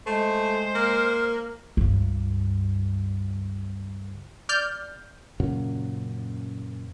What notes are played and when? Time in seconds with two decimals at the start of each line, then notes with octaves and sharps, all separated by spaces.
0.07 G#3 A3 C5
0.75 A#3 F6
1.77 C#2 G2
4.49 D5 F6 G6
5.40 F#2 A#2 C#3 F#3